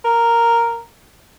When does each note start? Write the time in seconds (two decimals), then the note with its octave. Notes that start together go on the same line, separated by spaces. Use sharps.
0.04 A#4